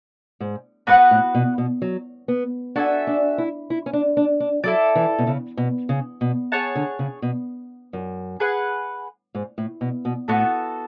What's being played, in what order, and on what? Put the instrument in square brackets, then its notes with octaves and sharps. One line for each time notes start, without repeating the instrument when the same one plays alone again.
[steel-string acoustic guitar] G#2
[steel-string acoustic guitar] G#2 [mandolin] B3 F#4 B4 F#5
[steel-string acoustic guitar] A2
B2
B2
F#3
B3
[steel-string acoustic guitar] D4 [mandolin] F#4 A4 E5 G#5
[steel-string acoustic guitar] D4
E4
E4
C#4
D4
D4
D4
[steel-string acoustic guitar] F#3 [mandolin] E4 A4 D5
[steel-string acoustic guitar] E3
B2
C#3
B2
C#3
B2
[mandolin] G#4 C#5 F#5 A5
[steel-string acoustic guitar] D3
C#3
B2
F#2
[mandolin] G#4 B4 F#5
[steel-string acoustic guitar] G#2
A2
B2
B2
[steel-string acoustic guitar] A2 [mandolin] B3 F#4 A4